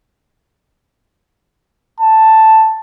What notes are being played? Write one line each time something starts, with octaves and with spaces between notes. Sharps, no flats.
A5